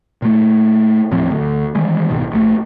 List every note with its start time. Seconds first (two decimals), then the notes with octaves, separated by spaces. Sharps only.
0.22 A#2 A3
1.11 D#1 A2 F3 C4
1.31 D2
1.75 D#3 E3 G3 G#3
2.10 C2 G#2 B2 D#3
2.31 A#1 A3